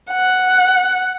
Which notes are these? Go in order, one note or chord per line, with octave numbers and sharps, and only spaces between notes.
F#5